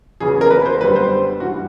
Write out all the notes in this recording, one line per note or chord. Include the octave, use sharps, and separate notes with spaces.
E2 C#3 F#3 B3 G#4
A#4
B4
C5
F#2 D3 G3 B3 B4
C5
G2 E3 G3 F#4